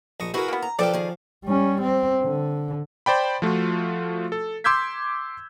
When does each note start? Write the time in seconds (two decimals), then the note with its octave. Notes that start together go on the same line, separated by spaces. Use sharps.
0.20 A#1 D#5 C#6
0.34 E4 F#4 G#4 A#4 B4
0.48 A#3 B3
0.62 A#5
0.79 F3 A4 B4 D5 F5 G5
0.93 D#3 G#4
1.45 G3 C#4
1.81 C4
2.23 D3
3.06 C5 D5 G5 B5
3.42 F3 A3 F4 F#4
4.32 A4
4.64 C6 D6 E6 G6 G#6 B6